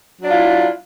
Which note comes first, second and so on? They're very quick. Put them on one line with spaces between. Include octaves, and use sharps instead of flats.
F#3 D4 F4 E4